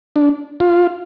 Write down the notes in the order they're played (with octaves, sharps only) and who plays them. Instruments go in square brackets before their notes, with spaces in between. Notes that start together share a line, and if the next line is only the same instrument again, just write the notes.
[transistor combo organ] D4
F4